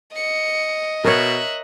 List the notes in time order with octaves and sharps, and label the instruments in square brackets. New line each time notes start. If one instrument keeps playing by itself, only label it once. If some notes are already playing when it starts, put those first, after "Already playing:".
[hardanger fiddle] D#5 [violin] C#7
[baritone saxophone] B2 [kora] A#4 C#5 [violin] E5 F#6